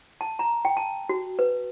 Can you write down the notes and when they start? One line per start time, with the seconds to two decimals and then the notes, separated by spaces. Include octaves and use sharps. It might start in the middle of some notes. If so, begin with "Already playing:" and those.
0.21 A5
0.39 A#5
0.65 G5
0.77 A5
1.09 F#4
1.39 B4